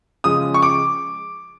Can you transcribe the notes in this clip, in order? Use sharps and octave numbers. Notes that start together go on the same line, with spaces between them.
C#3 F3 G#3 D#6
C#6
D6